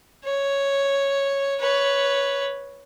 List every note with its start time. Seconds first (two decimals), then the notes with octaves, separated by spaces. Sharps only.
0.24 C#5
1.60 B4 C#5